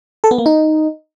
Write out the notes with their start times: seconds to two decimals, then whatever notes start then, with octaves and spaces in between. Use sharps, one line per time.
0.24 A4
0.31 B3
0.38 A#3
0.46 D#4